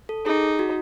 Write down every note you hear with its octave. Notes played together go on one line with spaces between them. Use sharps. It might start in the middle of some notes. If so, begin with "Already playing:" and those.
A4
D#4 G#4
F#4